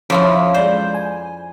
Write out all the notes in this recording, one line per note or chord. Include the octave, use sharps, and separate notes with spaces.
F2 F3 C#4 E4 C#5
G#3 C5 D5 G6
G#5